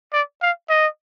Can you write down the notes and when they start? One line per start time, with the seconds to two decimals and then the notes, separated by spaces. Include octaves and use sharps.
0.13 D5
0.42 F5
0.69 D#5